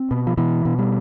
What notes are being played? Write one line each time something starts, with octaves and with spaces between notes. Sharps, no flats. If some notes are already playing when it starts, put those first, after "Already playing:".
Already playing: C4
B2
F3
B2 E3
B2
G3